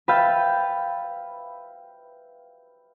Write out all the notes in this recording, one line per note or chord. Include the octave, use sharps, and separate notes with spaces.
B4 E5 F5 G5 G6 A6